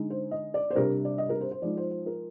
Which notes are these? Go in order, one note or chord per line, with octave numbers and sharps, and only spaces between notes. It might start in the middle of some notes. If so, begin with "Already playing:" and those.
Already playing: D3 G#3 D#4
C5
D#5
D5
C5
C3 G3 D4 A#4
D5
D#5
A#4
C5
C5
F3 G#3 D#4 D5
C5
C5
A#4